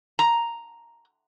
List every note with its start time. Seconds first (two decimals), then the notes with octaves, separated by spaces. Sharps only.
0.19 A#5